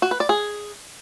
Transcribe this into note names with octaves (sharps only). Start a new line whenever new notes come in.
F#4
B4
D5
G#4